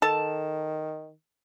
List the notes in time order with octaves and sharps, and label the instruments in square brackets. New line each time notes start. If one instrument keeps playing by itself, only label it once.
[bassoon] D#3 [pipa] A4 A5